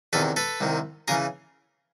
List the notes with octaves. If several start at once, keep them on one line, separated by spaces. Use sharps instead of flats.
E2 C3 D#3 A4 B4
A4 B4
C2 C3 D#3
C#3 E3 G#4 A#4